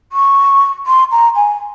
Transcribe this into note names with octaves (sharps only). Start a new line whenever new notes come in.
C#6
C6
A#5
G#5